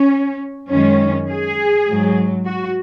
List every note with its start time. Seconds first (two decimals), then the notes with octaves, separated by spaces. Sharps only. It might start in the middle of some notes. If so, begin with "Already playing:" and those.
Already playing: C#4
0.69 F#2 D#3 G#3 C#4
1.29 G#4
1.87 G#2 F#3
2.46 F#4